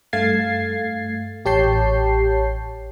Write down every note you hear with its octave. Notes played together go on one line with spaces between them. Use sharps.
G2 A3 F5 G#6 A6 C7
A1 G4 C#5 A5 G6 C7